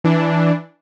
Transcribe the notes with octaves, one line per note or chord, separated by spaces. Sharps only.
E3 D4